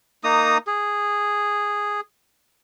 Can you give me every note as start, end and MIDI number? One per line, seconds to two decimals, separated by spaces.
0.24 0.58 58
0.24 0.58 63
0.24 0.58 82
0.24 0.58 87
0.67 2.00 68